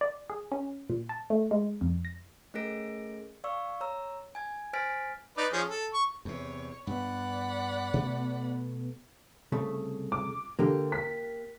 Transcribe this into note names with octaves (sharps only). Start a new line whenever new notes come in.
D5
G#4
C#4
A#2
A5
A3
G#3
F2
A#6
A3 C#4 G#4 A#4 A#6 D7
D5 F5 C#6 E6
C#5 A#5 E6
G#5 G#6
C5 G#5 F6 A6 B6 D7
D#4 B4 D5
F3 C#4 G#4
A4
C#6
E2 C3 C#5
G2 B3 D5 F#5 B5
B2 A3 B3
C2 C#3 A3
D6
D3 A#3 G4
B6